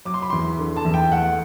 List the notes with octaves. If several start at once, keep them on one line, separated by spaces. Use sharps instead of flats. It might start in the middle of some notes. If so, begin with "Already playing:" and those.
F#3 D6
C6
B5
E2 C6
D3
A5
E2
G5
A3 F#5